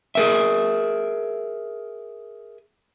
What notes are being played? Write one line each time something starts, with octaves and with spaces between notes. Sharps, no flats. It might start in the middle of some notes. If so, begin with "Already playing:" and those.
G#4 A#4 E5